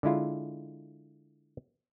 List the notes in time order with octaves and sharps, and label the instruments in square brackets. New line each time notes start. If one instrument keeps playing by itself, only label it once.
[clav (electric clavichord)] D3 G#3 E4 F4